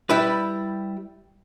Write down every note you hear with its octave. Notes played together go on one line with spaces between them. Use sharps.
G3 E4 B4